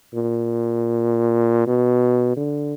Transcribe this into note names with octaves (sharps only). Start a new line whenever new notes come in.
A#2
B2
D3